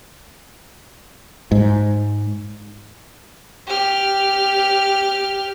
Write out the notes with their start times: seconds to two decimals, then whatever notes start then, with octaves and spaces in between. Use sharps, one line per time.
1.52 G#2
3.67 G4 F6